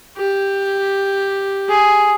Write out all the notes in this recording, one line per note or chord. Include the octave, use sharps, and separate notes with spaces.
G4
G#4